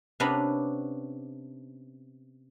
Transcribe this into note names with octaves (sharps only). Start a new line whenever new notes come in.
C3 B3 C#4 D4 A#5 B5